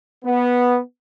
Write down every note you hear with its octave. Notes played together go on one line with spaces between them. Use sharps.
B3